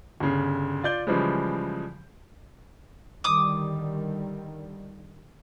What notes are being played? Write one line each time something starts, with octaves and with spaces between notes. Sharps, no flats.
G1 C#3
F4 D5 G6 G7
C#3 E3 F3 G3 G#3
D3 D#3 G3 D6 D#6